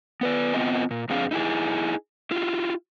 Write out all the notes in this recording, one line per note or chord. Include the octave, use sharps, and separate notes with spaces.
B3 B4 D5
B3 C4 F4 D#5 G#5
A#2
F2 F3 C4 D4 G#4 F5
D#4 E4 G4 G#4
E4 F4 G4